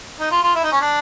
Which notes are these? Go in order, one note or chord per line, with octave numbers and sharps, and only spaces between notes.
D#4
F4
F4
E4
D#4
C#4
D4